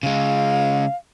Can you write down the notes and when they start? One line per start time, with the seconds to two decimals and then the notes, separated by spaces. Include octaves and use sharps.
0.03 C#3 G#3 F5